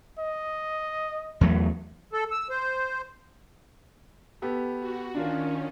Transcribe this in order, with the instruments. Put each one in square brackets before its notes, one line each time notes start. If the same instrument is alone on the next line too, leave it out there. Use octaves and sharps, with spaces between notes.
[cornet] D#5
[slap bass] E2 F#3 A3
[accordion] A4
E6
C5
[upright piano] B3 G4 A4
[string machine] F#4
[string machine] D#3 C#4 [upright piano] D4 F4 A#4